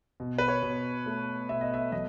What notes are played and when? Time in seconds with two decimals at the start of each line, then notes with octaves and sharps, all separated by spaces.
0.20 B2
0.38 B4
0.48 C#5
0.62 B2
1.06 A3
1.49 B2 E5
1.61 D#5
1.74 E5
1.92 F#3 D#5